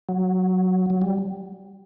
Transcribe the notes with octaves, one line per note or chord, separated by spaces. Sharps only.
F#3
F#3
G3